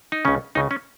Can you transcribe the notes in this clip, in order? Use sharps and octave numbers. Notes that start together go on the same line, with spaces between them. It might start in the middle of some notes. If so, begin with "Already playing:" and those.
D#4
C#2 C#3 C#4
C#2 C#3 D#4
C#4